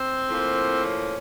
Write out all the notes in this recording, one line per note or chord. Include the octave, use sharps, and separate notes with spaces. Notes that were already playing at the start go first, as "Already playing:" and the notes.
Already playing: C4
A2 F3 A#3
C#4